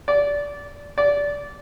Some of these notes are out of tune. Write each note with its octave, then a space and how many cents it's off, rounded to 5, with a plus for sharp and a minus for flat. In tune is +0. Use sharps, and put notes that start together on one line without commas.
D5 -20
D5 -20